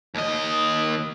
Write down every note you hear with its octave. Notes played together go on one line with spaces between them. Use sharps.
D#2 D#5